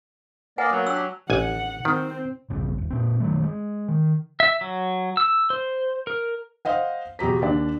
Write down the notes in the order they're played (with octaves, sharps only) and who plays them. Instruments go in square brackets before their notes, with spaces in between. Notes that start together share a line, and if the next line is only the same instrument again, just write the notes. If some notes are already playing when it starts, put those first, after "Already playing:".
[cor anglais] A#3 [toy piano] B4 F#5 G#5 [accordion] D5 D#5
[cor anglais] F#3 [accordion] A#3 B3
[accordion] D4 G4 [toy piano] E6
[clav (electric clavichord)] A1 G#5 [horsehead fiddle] F#5
[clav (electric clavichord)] D#3 [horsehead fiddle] C4
[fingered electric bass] E1 A#1 G2 C#3
D#1
A#2 C4
D#3 F#3 A3
G#3
D#3
[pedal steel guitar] E5
F#3
E6
C5
A#4
[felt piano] C5 D#5 F5 F#5
E2 B2 G4 A#5 B6
D#2 D4 D5